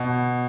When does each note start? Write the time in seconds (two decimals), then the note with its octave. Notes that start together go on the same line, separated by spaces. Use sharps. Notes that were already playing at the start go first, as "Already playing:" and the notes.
Already playing: B2